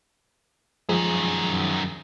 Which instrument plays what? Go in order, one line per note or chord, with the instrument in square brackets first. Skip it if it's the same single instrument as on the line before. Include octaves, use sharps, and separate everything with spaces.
[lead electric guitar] F#2 D#3 [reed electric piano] F3 G#3 G#4